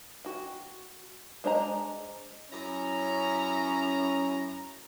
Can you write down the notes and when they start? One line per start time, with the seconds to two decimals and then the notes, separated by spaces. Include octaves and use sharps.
0.25 F#4 G5
1.44 G#3 D4 C5 D#5 A#5
2.51 F#2 C#4 E4 A#5